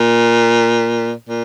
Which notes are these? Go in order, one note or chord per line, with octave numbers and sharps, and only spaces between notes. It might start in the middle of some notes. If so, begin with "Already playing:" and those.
Already playing: A#2
A#2